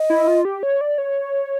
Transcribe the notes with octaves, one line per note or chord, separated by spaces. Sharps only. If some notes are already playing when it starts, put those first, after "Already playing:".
Already playing: D#5
E4
F4
G4
C#5
D5
C#5